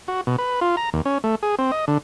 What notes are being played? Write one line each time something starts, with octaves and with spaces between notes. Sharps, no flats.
F#4
B2
B4
F4
A#5
D#2
C#4
A3
G#4
C4
D#5
D3